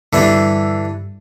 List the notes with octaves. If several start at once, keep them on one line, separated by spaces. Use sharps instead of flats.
G2 D3 E3 G3 D4